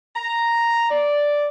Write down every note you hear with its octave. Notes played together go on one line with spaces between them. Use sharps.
A#5
D5